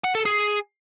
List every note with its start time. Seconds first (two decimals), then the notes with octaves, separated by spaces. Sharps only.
0.04 F#5
0.15 A4
0.25 G#4